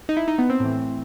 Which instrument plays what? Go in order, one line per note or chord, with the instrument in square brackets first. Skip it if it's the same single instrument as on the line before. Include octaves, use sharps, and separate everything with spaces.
[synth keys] D#4
E4
D#4
B3
C4
A2 E3